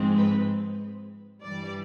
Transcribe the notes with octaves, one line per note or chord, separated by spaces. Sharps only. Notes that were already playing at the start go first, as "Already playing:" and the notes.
Already playing: G#2 F3 G#3 C4
B4
G2 E3 G3 D5